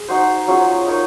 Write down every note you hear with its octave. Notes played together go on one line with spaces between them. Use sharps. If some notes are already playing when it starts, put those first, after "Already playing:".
Already playing: G#4
D#4 F#4 C5
F#3 C#4 F4 G#4
D#4 A#4 C#5